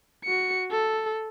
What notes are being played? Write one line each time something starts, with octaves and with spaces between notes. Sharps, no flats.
F#4 C#7
A4